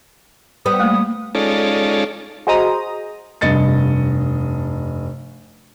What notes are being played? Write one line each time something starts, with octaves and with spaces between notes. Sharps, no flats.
G3 B3 B4 D#6
A3 A#3
G#3 C#4 D#4 F4 A4 D5
F#4 G#4 C5 D#5 A#5 D#6
F1 G2 D#5 A6 C#7